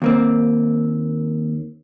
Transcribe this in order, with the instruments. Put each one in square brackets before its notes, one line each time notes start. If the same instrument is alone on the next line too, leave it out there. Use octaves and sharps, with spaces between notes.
[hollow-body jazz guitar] D#2 A#3 C4